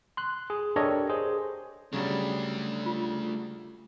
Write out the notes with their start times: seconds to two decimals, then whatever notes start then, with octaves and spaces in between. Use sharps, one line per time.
0.17 C6 F#6
0.50 G#4
0.76 D4 G4 A4 A#4 C#5 D#5
1.10 G#4 C5
1.93 C#3 F#3 G3 A3 D4
2.86 F4